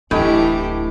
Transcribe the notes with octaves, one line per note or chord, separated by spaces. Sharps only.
D1 A2 E3 D4 G4 A4 D#5